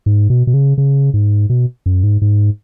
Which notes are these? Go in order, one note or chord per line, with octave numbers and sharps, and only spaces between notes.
G#2
B2
B2
C#3
C#3
G#2
B2
F#2
G#2
G#2